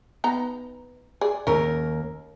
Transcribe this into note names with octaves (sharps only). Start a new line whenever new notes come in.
B3 D#4 A#5
G#4 D5
D#2 C#4 A#4